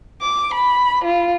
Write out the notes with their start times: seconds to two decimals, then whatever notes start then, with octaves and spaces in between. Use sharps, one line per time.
0.21 D6
0.54 B5
1.05 F4